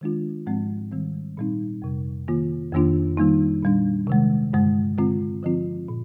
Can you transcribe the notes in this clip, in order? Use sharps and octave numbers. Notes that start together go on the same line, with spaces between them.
D#3 G#3 D4 F4
G#2 F3 G#3 C4
D#3 G3 C4
A#2 G3 C4 D#4
F2 C3 G3
D#3 A#3 F4
F2 D#3 A#3 D4 F4
D#3 G3 A#3 D#4
A#2 G3 D4
C3 D#3 G#3
G2 D3 G#3
D3 G#3 C4 F4
D3 F3 C4 F4
A#2